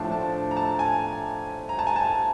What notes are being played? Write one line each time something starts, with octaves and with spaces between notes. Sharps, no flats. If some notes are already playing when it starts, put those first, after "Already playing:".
Already playing: A2 F3 A3 D4 A5
A5
A#5
A5
G#5
A#5
A5
G#5
A5